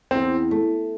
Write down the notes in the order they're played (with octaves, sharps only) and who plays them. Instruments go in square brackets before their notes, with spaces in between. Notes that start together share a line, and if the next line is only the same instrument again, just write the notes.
[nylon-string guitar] E2 [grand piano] C4
[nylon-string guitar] A3